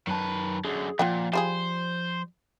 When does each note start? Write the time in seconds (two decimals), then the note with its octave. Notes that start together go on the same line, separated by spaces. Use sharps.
0.07 F#2 D#3 B4 A5
0.65 F#2 D3 G#4
0.99 A#2 F3 F4 F#5 G5
1.33 G3 F4 G#4 C5